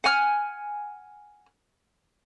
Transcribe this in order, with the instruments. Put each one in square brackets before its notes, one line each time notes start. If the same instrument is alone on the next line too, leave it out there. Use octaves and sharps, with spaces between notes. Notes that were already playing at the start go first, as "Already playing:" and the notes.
[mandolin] F#5 G#5 F6